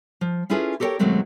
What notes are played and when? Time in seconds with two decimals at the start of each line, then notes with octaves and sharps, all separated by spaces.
0.21 F3
0.50 C#4 E4 F4 G#4 A4 B4
0.80 G4 A4 A#4 C5 C#5 G5
0.99 D#2 B2 F#3 G#3 A3 C4